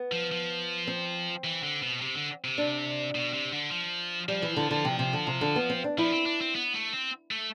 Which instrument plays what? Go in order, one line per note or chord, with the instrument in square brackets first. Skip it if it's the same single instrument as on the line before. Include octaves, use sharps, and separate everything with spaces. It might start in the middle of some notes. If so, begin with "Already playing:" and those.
Already playing: [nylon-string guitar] B3
[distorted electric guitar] F3
F3
[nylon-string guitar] C4
[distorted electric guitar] E3
D3
B2
C3
D3
C3
[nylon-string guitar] D4
[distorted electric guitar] B2
C3
D3
F3
[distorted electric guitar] F3 [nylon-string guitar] G3
[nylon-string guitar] E3
D3
D3
C3
C3
D3
C3
D3
B3
C4
D4
[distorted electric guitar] F3 [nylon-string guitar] E4
[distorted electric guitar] C4
D4
C4
B3
A3
C4
A3